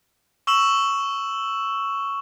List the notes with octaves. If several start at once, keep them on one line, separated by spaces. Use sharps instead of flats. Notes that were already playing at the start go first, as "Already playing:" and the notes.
C#6 E6 E7 F#7